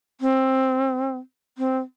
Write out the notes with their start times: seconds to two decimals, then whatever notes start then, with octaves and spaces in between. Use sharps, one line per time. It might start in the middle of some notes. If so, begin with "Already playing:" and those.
0.21 C4
1.58 C4